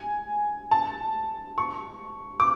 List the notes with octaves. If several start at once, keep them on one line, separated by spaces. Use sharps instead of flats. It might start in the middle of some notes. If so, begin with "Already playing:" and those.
Already playing: G#5
A5
C#6
D6